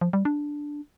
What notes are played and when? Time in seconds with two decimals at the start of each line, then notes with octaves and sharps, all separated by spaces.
0.01 F3
0.13 G3
0.25 D4